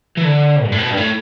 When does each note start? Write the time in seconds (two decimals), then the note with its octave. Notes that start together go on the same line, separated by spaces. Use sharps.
0.18 E3
0.24 D3
0.64 G2
0.72 A2
0.78 B2
0.90 G2
0.97 A2